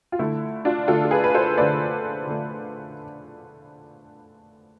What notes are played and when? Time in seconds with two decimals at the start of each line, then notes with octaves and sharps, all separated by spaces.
0.12 F4
0.19 D3 A3 E4
0.65 D4 F4
0.88 D3 A3 F4 A4
1.05 A4
1.11 G#4 B4
1.24 B4
1.34 A4 C5
1.57 D3 A3 B4 D5
2.27 D3 A3